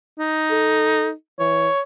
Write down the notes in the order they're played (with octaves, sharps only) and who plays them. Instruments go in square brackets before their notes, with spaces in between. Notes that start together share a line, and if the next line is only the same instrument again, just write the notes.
[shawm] D#4
[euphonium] A4
[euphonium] E3 [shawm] C#5